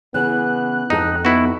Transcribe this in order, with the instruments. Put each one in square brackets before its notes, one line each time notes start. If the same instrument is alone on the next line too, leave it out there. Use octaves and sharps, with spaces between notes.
[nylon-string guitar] C#3 E3 [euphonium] B3 [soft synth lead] F#6
[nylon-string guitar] F2 A4 [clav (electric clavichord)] D#4
[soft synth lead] B3 [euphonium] D#4 [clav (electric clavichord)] E4 F#4